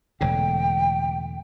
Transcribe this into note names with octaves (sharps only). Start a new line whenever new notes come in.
E1 A2 D3 G5